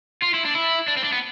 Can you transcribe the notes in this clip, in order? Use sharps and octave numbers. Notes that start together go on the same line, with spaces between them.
F4
E4
D4
E4
D4
C4
D4
B3